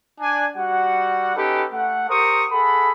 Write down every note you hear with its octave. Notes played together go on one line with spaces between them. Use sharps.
D4 G#5
G3 F#4 F#5
C#4 D#4 G4 A4 B4
A3 F#5
G4 A#4 C5 C#6 D#6
G#4 A4 F#5 B5